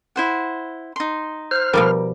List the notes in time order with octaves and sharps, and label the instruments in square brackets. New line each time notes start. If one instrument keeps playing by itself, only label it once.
[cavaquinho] E4 C5 F#5
D#4 C6
[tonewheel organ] C5 F6
[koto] B2 F3 G3 [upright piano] A#4